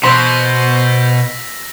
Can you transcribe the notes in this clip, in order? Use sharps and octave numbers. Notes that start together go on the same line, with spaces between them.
B2 C5 C6 E6 A#6 B6